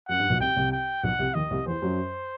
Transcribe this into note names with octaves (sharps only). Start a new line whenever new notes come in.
F#2 F#5
G2
B1 B2
C2 C3 G5
C2 C3
G5
B1 B2 F#5
C2 C3
D#2 D#3 D#5
C2 C3
E2 E3 C5
F#2 F#3